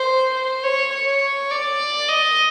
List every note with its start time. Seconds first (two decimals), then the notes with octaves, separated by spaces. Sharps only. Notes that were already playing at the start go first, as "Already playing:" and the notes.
Already playing: C5
0.35 C5
0.64 C#5
0.93 C#5
1.51 D5
2.08 D#5